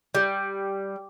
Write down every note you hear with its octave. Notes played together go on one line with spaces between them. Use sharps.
G3